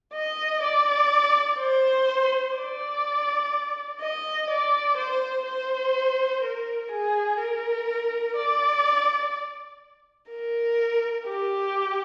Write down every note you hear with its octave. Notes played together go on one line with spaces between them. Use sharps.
D#5
D5
C5
D5
D#5
D5
C5
C5
A#4
G#4
A#4
D5
A#4
G4